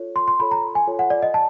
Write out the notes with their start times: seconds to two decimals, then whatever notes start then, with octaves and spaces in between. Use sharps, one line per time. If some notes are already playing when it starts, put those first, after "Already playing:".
Already playing: F4 A4 C#5
0.16 C6
0.28 C6
0.39 F4 A4 C#5 B5
0.51 A#5
0.75 G#5
0.87 F4 A4 C#5
0.99 F#5
1.10 D5
1.22 D#5
1.34 A5